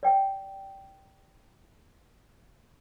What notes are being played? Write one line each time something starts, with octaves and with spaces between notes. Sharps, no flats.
D5 G5